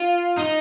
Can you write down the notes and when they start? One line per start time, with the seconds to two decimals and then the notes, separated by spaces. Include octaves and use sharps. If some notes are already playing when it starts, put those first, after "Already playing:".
Already playing: F4
0.37 D#4